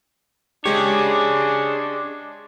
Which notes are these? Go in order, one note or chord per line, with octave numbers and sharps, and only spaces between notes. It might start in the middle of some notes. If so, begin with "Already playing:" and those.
G#3 D4 G4 G#4 C#5